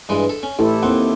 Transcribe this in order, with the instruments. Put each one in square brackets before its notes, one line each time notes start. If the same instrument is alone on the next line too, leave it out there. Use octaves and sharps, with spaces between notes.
[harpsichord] G2 E3 G#3
A4
C#4
[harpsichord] A1 [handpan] E4 G4 A4
[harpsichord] D#2 C4 F#5